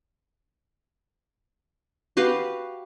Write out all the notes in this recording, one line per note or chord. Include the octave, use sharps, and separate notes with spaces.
F#4 G4 B4 F5